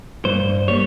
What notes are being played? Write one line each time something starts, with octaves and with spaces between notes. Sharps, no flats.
G2 C5
G3 A#3 C#5